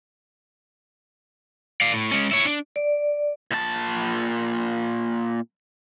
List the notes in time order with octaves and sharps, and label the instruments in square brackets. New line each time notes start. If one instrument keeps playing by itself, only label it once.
[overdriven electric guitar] D5 F5
A2
G#3 C#4
E4 C#5
D4
[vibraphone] D5
[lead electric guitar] A#2 A5